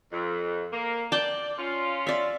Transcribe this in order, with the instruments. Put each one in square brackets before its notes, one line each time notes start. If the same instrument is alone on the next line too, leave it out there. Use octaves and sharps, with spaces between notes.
[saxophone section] F2
A#3
[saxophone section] D5 [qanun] G5 A5
[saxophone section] C#4 F4
[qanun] D5 E5